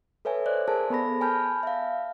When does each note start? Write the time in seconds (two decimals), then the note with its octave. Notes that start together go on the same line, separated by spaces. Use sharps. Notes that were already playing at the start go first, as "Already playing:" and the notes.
0.25 A4 B4 C#5 E5 G#5
0.46 C5 D5 F#6
0.68 G#4 A#4 C5 G#5 A5
0.90 B3 A4 B5 A#6
1.21 G#5 A5 B5 F6 G6
1.63 E5 F5